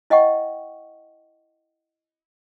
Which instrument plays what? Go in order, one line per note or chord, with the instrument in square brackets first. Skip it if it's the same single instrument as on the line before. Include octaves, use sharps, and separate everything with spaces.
[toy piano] E4 D#5 F#5 G5 C#6